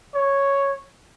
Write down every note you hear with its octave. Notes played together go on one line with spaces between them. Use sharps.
C#5